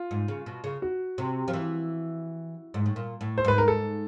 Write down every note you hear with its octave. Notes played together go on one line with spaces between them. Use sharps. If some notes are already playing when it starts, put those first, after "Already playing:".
Already playing: F4
G#2
C#3
B2
C#3
F#4
C3
F3
E3
G#2
A2
A#2
A2
C5
G#2 B4
A#4
A4